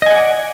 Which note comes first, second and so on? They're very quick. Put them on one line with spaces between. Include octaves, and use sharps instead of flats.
D#5 G#5 F#5 D5